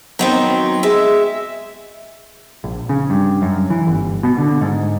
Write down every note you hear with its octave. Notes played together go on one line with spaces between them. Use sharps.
D#3 F#3 B3 C4
G#3 E5
A#1
C#3
G2
F#2
E3
G1
B2
D3
G#2